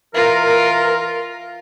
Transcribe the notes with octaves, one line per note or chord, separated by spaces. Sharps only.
E3 F4 A#4